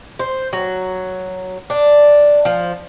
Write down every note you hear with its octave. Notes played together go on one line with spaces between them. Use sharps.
C5
F#3
D4
F3